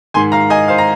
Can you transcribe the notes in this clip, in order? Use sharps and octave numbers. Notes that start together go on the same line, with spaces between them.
G#2 D#3 G#5 C6
F5 A#5
D#5 G#5
C5 F5
A#5